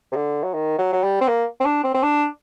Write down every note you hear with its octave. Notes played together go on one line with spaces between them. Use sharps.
C3
D3
F#3
D#3
F#3
F#3
G3
C4
A#3
C4
D4
C4
C4
D4